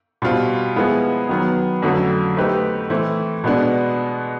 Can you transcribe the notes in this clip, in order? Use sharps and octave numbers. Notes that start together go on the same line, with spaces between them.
B2 G3 C4 F4
F3 G#3 B3 E4 G#4
D#3 F#3 B3
F2 D3 F#3 A3 C#4
A3 C4 D#4 G4 B4
E3 A3 C4 E4
B2 G#3 B3 D4